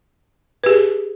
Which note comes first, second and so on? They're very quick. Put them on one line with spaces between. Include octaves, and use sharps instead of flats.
B4 G4 G#4